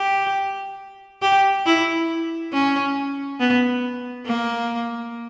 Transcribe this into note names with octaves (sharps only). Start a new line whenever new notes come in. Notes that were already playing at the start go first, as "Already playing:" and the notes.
Already playing: G4
G4
E4
C#4
B3
A#3